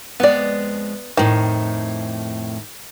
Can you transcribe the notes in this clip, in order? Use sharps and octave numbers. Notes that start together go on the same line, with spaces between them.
F2 G#3 B3 D5
F2 A2 D#3